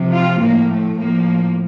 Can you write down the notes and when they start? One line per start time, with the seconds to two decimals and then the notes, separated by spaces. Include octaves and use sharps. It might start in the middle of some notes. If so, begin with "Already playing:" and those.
Already playing: C3 F3
0.11 F4
0.40 A2 F3 A#3
0.69 A3
0.96 A2 F3 A#3